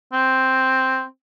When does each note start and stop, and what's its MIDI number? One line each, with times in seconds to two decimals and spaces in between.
0.13 1.04 60